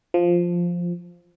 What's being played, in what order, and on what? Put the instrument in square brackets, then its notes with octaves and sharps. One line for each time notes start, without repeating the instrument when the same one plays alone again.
[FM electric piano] F3